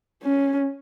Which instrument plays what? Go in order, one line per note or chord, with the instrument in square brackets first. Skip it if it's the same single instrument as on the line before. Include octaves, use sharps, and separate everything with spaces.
[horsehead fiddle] C#4